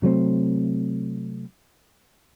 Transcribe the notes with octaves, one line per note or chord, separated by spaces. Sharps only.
C3 F#3 A3 C4